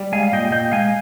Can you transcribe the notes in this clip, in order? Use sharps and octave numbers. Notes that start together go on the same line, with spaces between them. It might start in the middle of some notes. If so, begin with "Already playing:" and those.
Already playing: G3
G#3 F5 G#5
F5
A#2 D#5 G5
A#2 D#5 G5
G#3 F5 G#5